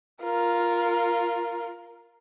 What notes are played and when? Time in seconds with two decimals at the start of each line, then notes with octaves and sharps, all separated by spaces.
0.23 F4 A#4